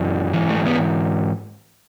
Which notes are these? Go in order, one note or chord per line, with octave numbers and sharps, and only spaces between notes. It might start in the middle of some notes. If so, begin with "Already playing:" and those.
Already playing: F#2 E3
G#2 E3
A3
B3